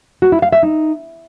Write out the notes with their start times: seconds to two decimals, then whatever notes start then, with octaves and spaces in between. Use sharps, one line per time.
0.22 F#4
0.32 E4
0.42 F5
0.52 E5
0.63 D#4